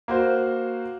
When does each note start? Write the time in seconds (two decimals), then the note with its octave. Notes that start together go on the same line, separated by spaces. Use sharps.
0.08 A#3 F#4 C5